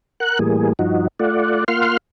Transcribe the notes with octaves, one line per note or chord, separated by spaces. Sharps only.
A#4 F#5 F#6
A2 E3 G3 A#3 G#4
G2 F3 D#4 F#4
A3 F4 D5 F#5
A#3 F4 F5 F#5 C6 F6